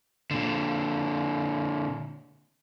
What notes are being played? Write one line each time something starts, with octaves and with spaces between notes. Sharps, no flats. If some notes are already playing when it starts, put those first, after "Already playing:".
A#2 D3